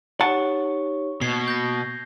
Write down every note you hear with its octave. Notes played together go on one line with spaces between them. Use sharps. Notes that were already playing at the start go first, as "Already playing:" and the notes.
D#4 G4 C#5 F#5 A5 C#6
B2 A#3 G#6 C7 G7
G6 A#6